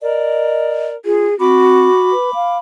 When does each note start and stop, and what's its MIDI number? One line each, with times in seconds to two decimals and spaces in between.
0.02 0.96 70
0.02 0.96 74
0.02 0.88 75
1.05 1.27 65
1.05 1.37 68
1.39 1.89 60
1.39 2.13 66
1.39 2.58 83
1.39 2.58 86
2.12 2.31 71
2.34 2.58 77